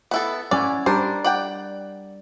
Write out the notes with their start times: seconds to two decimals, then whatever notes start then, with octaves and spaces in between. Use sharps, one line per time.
0.11 B3 E4 A4
0.51 C#4 E4 D5 F#5
0.86 G3 D4 A#4 C5
1.24 D5 F#5 G5